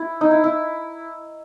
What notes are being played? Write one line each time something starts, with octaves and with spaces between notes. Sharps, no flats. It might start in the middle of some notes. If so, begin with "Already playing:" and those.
Already playing: E4
D#4
E4
E4